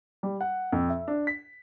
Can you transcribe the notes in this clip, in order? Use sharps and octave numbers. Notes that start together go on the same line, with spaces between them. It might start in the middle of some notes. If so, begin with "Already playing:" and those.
G3
F#5
F2
E5
D4
B6